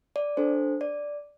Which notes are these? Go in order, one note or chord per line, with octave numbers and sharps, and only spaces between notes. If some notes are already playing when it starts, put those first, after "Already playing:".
D5
D4 A4 C5
D5